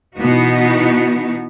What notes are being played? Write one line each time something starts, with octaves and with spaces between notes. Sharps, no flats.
B2 E3 B3 D#4 F#4